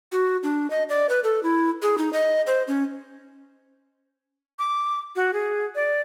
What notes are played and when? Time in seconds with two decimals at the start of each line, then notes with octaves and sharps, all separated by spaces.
0.12 F#4
0.43 D4
0.70 D#5
0.89 D5
1.09 B4
1.24 A4
1.43 E4
1.82 G#4
1.98 D#4
2.13 D#5
2.47 C5
2.68 C#4
4.59 D6
5.16 F#4
5.33 G#4
5.75 D5